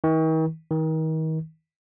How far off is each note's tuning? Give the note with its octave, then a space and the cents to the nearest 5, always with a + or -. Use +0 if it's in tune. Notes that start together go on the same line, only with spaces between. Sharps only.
D#3 +45
D#3 +35